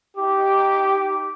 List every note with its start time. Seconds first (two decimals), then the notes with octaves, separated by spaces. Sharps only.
0.17 D#4 G4 D6